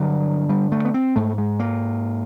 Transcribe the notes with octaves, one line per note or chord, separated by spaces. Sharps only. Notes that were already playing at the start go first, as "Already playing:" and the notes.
Already playing: G2 D3 F#3
G3
A3
B3
C4
G#2 A3
G#3
A#3